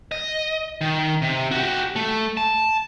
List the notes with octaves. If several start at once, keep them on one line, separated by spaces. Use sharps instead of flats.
D#5
D#3
C3
F#4 G4
A3
A5